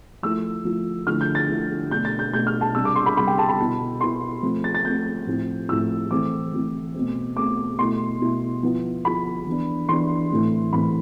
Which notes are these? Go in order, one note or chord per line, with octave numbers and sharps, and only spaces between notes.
F3 A3 E4 E6
F3 A3 E4
D3 F3 A3 E4 F6
G6
A6
D3 F3 A3 E4
B2 A3 D4 G6
A6
G6
B2 A3 D4 G6
F6
A5
C3 G3 D4 E6
D6
C6
B5
C3 G3 D4 B5
G5
A5
B5
B2 B3 E4
B2 B3 E4 C6
F3 A3 C4
A6
A6
F3 A3 C4 G6
A2 F3 C4 E4
A2 F3 C4 E4 E6
E3 A3 C4 E4 D6
E3 A3 C4 E4
B2 A3 C4
B2 A3 C4 D6
B2 A3 E4 C6
B2 A3 E4
F3 B3 E4
F3 B3 E4 B5
E3 B3 D4
E3 B3 D4 C6
A2 E3 A3 C4
A2 E3 A3 C4 B5